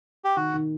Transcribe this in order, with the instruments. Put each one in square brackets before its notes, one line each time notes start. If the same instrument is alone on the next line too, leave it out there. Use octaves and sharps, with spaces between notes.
[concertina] G4
[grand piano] D#3 [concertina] F#4
[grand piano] D#3